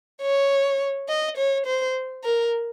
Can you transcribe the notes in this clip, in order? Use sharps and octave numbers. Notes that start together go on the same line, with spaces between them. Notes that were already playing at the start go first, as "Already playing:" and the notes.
C#5
D#5
C#5
C5
A#4